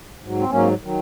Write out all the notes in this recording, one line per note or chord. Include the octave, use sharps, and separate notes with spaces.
G#2 F#3
C4
G#2 F#3 A#3 C#4
D#3 F#3